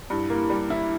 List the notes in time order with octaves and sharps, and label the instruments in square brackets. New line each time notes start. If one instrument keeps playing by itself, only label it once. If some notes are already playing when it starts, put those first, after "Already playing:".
[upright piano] G2 [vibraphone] E4 G4
[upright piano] A#3
G3
E4